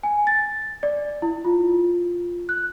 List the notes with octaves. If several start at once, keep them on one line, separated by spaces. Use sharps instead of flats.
G#5
A6
D5
E4
F4
F#6